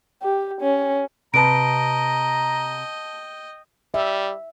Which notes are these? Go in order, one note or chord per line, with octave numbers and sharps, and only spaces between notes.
G4
C#4
C3 B4 D#5 G5 A5 A#5 D7
G3 E5